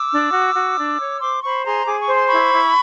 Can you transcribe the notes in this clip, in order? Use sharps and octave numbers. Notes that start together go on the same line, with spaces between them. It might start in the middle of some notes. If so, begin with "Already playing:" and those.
Already playing: D6 E6
D4
F#4
F#4
D4
C#5
C5 C6 D6
C5 B5 C#6
G#4 A#5 C6
G#4 D6
C#6
C5
C6
E4 B5 C#6
E4